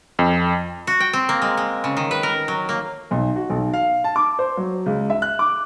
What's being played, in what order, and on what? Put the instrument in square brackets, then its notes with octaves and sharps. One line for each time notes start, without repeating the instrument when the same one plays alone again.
[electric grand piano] F2
[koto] F#4
G5
C4
A#3
G#3
G#3
C#3
D#3
B4
A#4
F#3
A#3
[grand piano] B1
F#4
B1
F5
A5
D6
C5
F#3
C#2
E5
F#6
D6